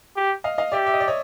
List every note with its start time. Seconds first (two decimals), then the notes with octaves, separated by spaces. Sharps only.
0.16 G4
0.44 D#5 F5
0.58 D#5 F5
0.72 G4 D5 E5
0.87 E5
0.94 D#5
1.00 D5
1.08 C#5 D#5